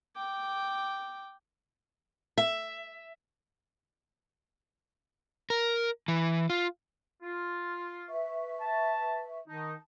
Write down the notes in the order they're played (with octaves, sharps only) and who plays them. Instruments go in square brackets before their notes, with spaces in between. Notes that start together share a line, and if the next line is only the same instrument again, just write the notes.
[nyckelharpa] G5 D6
[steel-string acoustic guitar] E5
[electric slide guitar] A#4
E3
F4
[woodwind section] F4
[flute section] B4 E5 C#6
[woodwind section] A5
[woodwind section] D#3 D#4 [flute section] A5